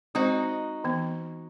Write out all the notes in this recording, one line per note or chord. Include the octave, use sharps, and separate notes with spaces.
G#3 C4 D#4 F#4 C5
E3 B3